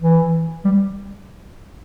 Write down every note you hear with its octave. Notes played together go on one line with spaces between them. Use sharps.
E3
G3